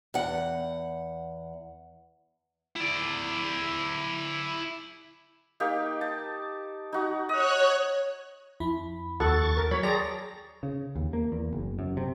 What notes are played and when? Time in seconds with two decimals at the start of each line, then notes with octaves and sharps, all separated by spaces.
0.14 E2 F#5
2.76 E4 D5
5.60 A#3 D#4 G4
6.01 A5
6.92 D#4 F#4
7.29 C#5 D#5 F#6
8.60 F2 E4 B5
9.20 D#2 F#4 A4 F#5 C#6 A6
9.57 A#4
9.71 F#3 C#5 B5
9.83 G#4 D5 G5 A5 A#5 C6 A#6
10.63 C#3
10.96 D#2
11.13 A#3
11.32 E2
11.53 F#1
11.79 F#2
11.97 C3